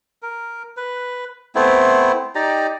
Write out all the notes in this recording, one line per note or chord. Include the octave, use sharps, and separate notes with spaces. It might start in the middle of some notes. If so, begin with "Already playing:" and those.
A#4
B4
A3 B3 C4 E4
D#4 G4 D5 A#5